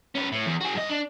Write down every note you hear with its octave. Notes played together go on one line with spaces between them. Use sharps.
C#4 B4
A2
E2
F#4 G#4
G2 D#5
D4